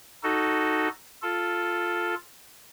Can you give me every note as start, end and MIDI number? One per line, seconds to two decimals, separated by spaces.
0.23 0.89 63
0.23 0.89 66
0.23 0.89 69
1.22 2.15 65
1.22 2.15 69